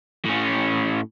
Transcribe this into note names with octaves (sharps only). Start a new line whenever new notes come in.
A2 C#4